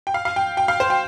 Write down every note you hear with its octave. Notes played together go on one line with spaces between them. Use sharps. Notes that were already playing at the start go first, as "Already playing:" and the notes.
G5
F5
F5
G5
G5
F5
C5
G5